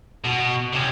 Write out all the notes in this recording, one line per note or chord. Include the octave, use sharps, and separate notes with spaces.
B2
C3 C#4